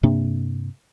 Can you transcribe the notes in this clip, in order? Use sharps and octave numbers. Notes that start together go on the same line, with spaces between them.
G2 C3 A#3 D4